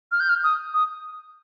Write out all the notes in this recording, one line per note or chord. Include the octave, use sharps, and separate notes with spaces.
F6
G6
F6
D#6
D#6